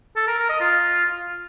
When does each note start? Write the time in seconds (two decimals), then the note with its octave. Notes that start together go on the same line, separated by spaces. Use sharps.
0.16 A4
0.27 A#4
0.38 A#4
0.49 D#5
0.61 F4